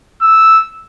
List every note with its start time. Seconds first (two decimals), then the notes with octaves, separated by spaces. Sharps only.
0.22 E6